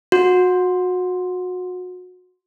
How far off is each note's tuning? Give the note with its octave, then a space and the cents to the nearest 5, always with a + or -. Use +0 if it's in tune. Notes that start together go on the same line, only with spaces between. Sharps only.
F#4 -25